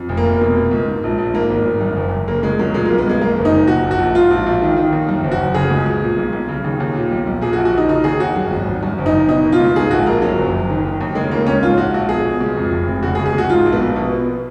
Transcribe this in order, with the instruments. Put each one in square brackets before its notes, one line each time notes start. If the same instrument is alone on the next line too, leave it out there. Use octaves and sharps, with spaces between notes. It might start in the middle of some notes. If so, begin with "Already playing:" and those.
Already playing: [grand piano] F2
F1
A#3
F1
B2
B2
C#2
G#2
A#1
A#1
G#2 A#3
G#1
G#1
F#2
F#1
F#1
C#3 A#3
C#2 G#3
C#2 F#3
A#2 G#3
B1 A#3
B3
B1 G#3
F#2 A#3
F#1
D#4
F#1
A#2 F#4
A#1
F#4
A#1
G#2 F4
A#1
A#1
D#3
D#3
D#2
F#2
F#1
F#4
F#1
C#3 G#4
C#2
C#2
A#2
B1
B1
C#3
D#2
D#2
A#2
B1
B1
A#2 G#4
F#4
A#1
F#4
A#1
D#4
C#3 D#4
D#2 G#4
D#2 F#4
F#2
G#1
G#1
F#2
F#1
D#4
F#1
B2 D#4
B2
F4
C#2
G#2 G#4
A#1 F#4
A#1 A#3
F#2 F#3
F#1
F#1
D#3
D#3
D#2
C#3 G#3
C#2 A#3
C#2 C#4
G#2 F4
A#1 F#4
A#1 F#4
B2 G#4
B2
C#2
F2
F1
F1
C#3 F#4
G#4
C#2
G#4
C#2 F#4
G#2 F4
A#1
B3
A#1
B2
B2